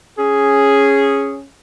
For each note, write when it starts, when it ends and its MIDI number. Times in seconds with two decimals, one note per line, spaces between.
0.18 1.44 61
0.18 1.44 68